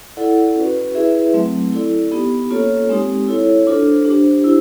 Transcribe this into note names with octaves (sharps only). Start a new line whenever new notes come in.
E4 A4 D5 F#5
C#4 F#4 B4
E4 G#4 B4 E5
F#3 A3 C4
E4 A4 D5
B3 D#4 G4
A#3 C#4 F4 A4 C#5
G#3 C4 D#4 G4
E4 A4 C#5
D4 F4 A4 C5
D4 G4 C5
E4 G4